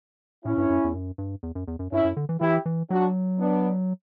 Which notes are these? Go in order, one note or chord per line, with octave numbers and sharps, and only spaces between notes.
A2 C#4 E4
G2
F#2
E2
F#2
G2
E2
F#2
E2
F#2
G2 C#4 E4
F#2
D3
E3
E3 E4 G4
E3
F#3 D4 F#4
B3 D4